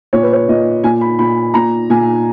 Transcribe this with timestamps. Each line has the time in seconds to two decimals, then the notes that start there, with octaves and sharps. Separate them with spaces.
0.13 A#2 C#5
0.23 B4
0.33 C#5
0.49 A#2 D#5
0.84 A#2 G#5
1.01 B5
1.19 A#2 B5
1.54 A#2 A#5
1.90 A#2 G#5